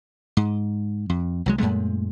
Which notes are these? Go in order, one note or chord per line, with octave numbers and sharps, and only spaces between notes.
G#2
F2
C2 F#3 G#3
F#2 A#2 G#3 A3